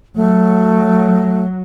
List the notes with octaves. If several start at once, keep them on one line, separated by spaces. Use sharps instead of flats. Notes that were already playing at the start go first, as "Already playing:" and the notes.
F#3 A3